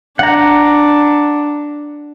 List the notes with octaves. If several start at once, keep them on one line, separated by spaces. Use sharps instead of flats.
D4 F#5 A#5